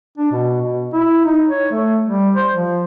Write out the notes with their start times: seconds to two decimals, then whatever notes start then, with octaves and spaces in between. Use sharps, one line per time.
0.18 D4
0.32 B2
0.62 B2
0.93 E4
1.25 D#4
1.49 C#5
1.72 A3
2.06 G3
2.36 C5
2.55 F3